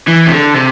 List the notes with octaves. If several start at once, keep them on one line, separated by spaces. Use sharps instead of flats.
E3
C3
D3
C3